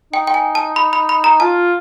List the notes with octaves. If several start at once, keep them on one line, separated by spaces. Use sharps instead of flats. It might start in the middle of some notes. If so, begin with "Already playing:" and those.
D#4 G5
G5
G#5
A5
B5
B5
B5
A#5
F4 A5